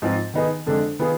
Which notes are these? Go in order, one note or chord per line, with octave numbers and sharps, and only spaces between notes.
G#2 F3 C4
D#3 B3 D#4 G#4
F2 D3 G#3 D4
D#3 B3 F4 G#4